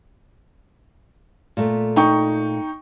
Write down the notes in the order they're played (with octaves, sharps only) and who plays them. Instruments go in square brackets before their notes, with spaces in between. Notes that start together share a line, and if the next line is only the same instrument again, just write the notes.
[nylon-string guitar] A#2 A3
[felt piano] D#4 G5 C#6